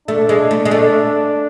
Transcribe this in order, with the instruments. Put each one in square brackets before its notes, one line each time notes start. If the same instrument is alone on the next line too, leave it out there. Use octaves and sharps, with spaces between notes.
[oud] A3 [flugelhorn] D4
[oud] G#3
A3
G#3
A3